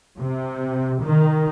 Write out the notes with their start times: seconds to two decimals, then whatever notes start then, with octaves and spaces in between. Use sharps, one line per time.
0.19 C3
1.02 D#3